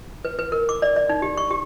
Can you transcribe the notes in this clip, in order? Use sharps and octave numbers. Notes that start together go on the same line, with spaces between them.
B4
B4
A#4
D6
D5
D5
D#4
G4
C#6
G4